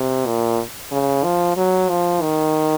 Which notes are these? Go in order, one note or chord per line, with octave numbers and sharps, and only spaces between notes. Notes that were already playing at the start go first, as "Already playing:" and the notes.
Already playing: C3
A#2
C#3
F3
F#3
F3
D#3